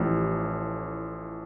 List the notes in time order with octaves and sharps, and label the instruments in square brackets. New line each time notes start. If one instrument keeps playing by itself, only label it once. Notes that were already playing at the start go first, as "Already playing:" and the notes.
Already playing: [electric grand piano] A1 A2 F3 G4